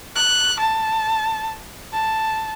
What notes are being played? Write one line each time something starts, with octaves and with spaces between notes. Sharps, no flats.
F#6
A5
A5